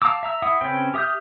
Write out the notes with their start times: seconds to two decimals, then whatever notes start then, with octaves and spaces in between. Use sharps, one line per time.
0.02 F5 A5 A#5 D6 E6
0.23 E5 A#5 E6
0.42 E4 E5 F#5 D#6 E6
0.61 C#3 C4 C#4 B4 G5
0.94 G4 E5 D#6 F6 G6